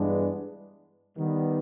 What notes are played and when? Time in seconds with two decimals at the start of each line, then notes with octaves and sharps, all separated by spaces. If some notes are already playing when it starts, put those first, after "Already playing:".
Already playing: G2 E3 G#3 B3 D4
1.16 D#3 G3 B3